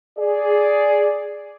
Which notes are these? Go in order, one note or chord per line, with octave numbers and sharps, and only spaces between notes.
G#4 D5